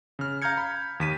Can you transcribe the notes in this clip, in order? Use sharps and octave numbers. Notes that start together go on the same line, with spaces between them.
C#3 F6
F5 A#5 F6 G6 G#6 C#7
B5
D#2 B6 D#7